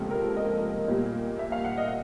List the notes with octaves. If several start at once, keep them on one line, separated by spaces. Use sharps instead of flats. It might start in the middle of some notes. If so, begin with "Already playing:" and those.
Already playing: C#2 C3 F3 A#3 A4
A#4
D#5
A#2 G3 A#3
E5
F5
F#5
D#5